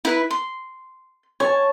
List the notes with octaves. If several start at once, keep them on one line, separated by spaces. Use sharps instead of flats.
E4 B4 B5
C6
C#5 G#5 A5